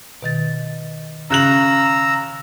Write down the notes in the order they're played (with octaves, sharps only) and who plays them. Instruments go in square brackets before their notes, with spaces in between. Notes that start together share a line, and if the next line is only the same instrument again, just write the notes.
[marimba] B2 D#3 A6
[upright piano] C#3 F#6 F#7 [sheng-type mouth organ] A#5 E6